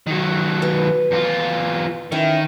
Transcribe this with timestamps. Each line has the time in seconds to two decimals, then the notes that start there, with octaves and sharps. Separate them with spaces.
0.07 D#3 F#3
0.62 B4
1.12 E2 F4
2.12 D#3 C#4 E4